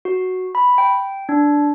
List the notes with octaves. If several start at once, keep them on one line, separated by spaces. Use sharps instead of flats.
F#4
B5
G5
D4